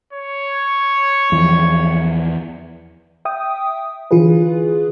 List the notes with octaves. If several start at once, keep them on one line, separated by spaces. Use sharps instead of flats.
C#5
E2 F3
E5 G5 D#6
D3 E3 F4 G#4 B4